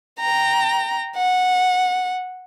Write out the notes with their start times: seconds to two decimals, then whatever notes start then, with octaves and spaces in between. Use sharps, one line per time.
0.20 G5 A#5
1.16 F#5